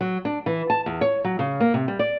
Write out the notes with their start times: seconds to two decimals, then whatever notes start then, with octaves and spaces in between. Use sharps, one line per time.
0.01 F#3
0.25 D4
0.46 E3
0.70 A5
0.86 E2
1.01 C#5
1.24 F#3
1.39 C#3
1.60 A#3
1.74 C3
1.88 G3
1.99 D5